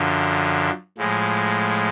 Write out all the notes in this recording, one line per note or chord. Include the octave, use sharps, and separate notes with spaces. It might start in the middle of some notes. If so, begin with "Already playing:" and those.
Already playing: F#2 D3 F3
A2 F3 G#3